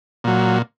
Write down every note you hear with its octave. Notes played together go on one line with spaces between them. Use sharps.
A#2 F#3